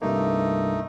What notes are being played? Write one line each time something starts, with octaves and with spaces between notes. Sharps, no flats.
C2 G2 A3 A#3 D#4